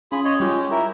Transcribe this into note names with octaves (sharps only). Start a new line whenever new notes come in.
C#4 F4 G#4 B5 C6
C#5 D#5
G3 G#3 C#4 F4 G4
E4 A#4